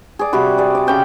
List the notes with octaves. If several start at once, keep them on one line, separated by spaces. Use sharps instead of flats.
G#4 D5
C3 G3 F#4 B5
G#4 D5
D5
C#3 C#4 G5 B5